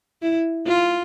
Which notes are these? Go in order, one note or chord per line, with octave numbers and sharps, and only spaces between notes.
E4
F4